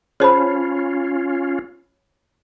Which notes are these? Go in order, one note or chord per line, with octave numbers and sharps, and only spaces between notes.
C#4 F4 G#4 C5 C#5 A5 B5